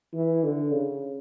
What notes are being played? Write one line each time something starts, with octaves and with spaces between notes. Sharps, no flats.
E3
D3
C#3